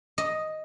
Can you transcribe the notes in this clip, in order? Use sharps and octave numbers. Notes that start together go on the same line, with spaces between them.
D#5